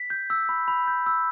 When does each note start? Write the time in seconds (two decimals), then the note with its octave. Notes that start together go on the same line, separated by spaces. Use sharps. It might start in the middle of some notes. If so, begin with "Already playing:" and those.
Already playing: B6
0.10 G6
0.30 E6
0.49 B5
0.68 B5
0.87 G6
1.06 E6